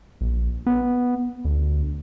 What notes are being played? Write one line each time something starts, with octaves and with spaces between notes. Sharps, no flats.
A#1
B3
D2